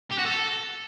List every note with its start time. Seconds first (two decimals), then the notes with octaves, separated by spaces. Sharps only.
0.12 G4
0.19 F#4
0.26 A4